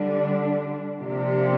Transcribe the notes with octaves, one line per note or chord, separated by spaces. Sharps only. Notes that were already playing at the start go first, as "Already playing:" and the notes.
Already playing: D3 G3 D4
C3 F3 A#3 D4 G4